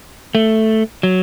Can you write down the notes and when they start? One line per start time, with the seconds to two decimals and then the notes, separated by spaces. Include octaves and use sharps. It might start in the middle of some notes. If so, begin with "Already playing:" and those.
0.35 A3
1.03 F#3